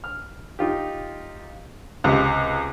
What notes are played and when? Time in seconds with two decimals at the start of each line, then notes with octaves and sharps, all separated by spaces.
0.04 F6
0.59 D#4 F4 G4
2.04 C#2 C3